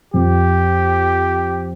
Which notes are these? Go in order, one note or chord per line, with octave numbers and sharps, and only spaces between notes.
F2 G4